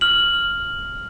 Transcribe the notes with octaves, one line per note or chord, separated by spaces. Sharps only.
F6 F#7